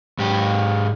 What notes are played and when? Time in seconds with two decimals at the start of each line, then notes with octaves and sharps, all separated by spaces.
0.19 G#2 G4